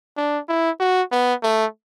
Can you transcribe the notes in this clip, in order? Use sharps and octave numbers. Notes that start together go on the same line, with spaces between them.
D4
E4
F#4
B3
A3